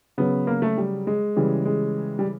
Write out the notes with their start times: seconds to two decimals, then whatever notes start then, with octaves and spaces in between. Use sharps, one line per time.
0.18 C#3 F#3 B3
0.47 A#3
0.62 A3
0.78 G3
1.07 G#3
1.36 C#3 E3 G3
1.65 G#3
2.19 G3